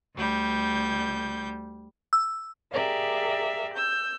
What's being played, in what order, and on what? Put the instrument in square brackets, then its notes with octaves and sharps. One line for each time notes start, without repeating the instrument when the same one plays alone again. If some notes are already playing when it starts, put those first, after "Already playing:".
[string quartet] D2 G3 G6
[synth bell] E6
[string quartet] G4 G#4 A#4 D5 E5 F5
E6 G6